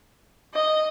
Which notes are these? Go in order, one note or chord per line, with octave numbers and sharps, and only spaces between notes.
D#5